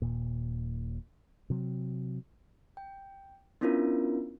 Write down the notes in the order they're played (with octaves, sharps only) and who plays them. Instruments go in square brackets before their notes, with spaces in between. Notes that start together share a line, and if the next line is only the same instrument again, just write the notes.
[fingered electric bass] D#1 A#2
C3 F#3
[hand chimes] G5
B3 C#4 D4 E4 F4 A#4